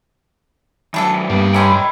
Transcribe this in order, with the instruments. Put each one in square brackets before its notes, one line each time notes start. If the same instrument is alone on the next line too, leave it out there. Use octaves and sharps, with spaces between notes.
[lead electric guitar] D#3 F#3 [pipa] E3 D4 A4
[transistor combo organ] G2 [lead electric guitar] A#3 B3
[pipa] D3 C#4 C6 [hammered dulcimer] D#4 E4 B4 [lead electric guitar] D#5 G5